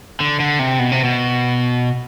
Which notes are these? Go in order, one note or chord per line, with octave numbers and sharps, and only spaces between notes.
D3
D3
C3
B2
C3
B2